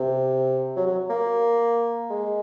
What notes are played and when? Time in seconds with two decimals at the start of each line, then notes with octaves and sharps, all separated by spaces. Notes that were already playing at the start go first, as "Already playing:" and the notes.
Already playing: C3
0.76 F#3
0.87 F#3
1.10 A#3
2.10 G#3